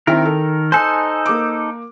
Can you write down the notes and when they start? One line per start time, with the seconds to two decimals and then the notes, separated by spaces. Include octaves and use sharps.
0.07 D#3 C4 E4 A#4
0.25 A4
0.72 D#4 A4 C5 G#5 F#6
1.26 A#3 D6